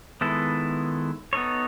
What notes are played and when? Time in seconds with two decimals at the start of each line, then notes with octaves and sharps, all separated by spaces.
0.21 D#3 G#3 B3 E4 A4
1.33 B3 D#4 A4 C#5